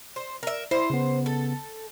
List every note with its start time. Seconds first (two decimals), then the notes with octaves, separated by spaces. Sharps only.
0.16 C5
0.43 A#4 E5
0.71 E4 C5
0.90 C#3 B3
1.26 A4